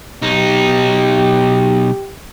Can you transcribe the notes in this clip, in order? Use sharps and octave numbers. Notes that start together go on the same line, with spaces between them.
B1 D#4 G4